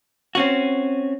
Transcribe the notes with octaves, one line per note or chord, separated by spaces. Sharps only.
C4 C#4 F#4